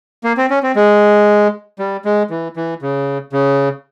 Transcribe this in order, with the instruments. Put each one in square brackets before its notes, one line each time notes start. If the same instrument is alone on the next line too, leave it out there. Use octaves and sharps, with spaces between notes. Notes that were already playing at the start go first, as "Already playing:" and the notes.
[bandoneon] A#3
C4
C#4
C4
G#3
G3
G#3
E3
E3
C#3
C#3